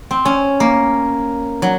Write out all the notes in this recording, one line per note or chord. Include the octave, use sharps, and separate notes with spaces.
C4
C#4
A#3
F#3